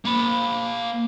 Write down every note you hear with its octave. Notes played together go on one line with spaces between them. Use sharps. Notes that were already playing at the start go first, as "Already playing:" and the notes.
A#3 B5